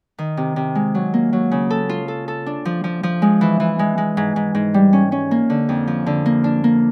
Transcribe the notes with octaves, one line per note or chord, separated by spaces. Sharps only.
D#3
C3
C3
G#3
F#3
A#3
F#3
C#3
A4
F4
A4
A4
D4
F3
F3
F3
G#3
E3
E3
G#3
G#3
G#2
G#2
G#2
G3
C#4
C#4
A#3
D3
F2
F3
D3
A#3
D4
A#3